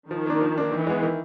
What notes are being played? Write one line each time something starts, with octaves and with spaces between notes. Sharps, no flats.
D#3 F3
A#3 D4
F3
A#3 D4
D#3 E3
G#3 B3
D#3